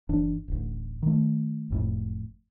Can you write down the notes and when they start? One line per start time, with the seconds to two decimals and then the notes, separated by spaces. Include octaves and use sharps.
0.09 F#1 E3 D4
0.48 D1 A1
1.03 D#3 A3
1.70 F#1 F2 A2